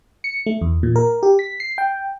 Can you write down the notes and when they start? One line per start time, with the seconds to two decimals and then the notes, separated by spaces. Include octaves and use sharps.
0.24 C#7
0.46 A3
0.61 E2
0.83 A#2
0.96 A#4
1.23 G4
1.39 B6
1.60 C7
1.78 G5